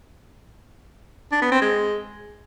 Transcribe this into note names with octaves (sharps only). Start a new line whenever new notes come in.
D4
B3
C4
G#3